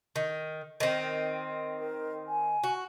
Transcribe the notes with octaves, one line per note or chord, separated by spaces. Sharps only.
D#3
D#3 C4
A#4
G#5
F#4